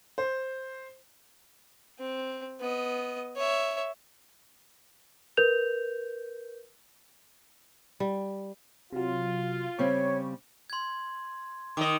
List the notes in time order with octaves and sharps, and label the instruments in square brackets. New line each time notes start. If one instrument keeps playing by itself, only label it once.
[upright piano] C5
[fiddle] C4
B3 D#5
C#5 E5
[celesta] A#4 B4 G6 F7
[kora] G3
[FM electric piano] C3 F#3 [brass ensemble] F4
[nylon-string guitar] C#3 G3 C4 [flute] C#5 [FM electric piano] C#6
[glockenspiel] C6 G#6
[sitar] D#3 D#5 [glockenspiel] D6